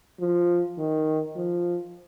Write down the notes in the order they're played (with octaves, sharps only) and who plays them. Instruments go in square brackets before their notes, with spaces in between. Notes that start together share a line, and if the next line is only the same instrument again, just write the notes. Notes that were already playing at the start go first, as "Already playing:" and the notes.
[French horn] F3
D#3
F3